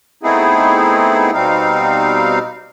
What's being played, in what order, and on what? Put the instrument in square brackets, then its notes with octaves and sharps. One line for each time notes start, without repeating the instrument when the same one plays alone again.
[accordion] A3 B3 C4 D#4 E4 G#4
B2 G3 C4 D#4 F5